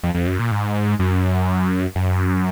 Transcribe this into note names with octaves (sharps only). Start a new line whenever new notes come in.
F2
F2
F#2
A#2
G#2
F#2
F#2